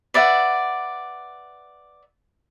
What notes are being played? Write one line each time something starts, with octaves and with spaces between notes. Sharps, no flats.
B4 D5 E5 F#5